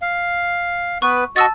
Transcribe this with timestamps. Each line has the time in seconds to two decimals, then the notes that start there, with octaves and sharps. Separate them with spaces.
0.02 F5
1.02 B3 B4 C#6
1.36 F#4 D#5 A5 C#6 E6 A6